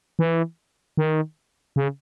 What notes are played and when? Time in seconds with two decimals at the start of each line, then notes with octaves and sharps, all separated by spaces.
0.19 E3
0.97 D#3
1.76 C#3